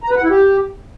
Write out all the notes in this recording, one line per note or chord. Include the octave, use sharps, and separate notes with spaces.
A#5
B4
F#5
E4
G4